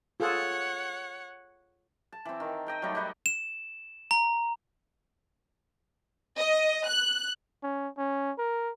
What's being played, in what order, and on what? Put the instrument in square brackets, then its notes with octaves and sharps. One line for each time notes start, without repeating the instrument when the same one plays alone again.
[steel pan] F4 G#4 A4 [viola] C#5 F#5
[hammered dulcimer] A5
E3 C4
D#3
D#5 G5 A#5
F#3 G3 A3 D#4
D#4 G4 B4 D#5
[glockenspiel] E7
A#5
[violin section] D#5
F#6
[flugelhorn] C#4
C#4
A#4